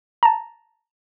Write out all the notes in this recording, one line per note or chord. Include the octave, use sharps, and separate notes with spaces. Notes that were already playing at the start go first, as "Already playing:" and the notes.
A5 A#5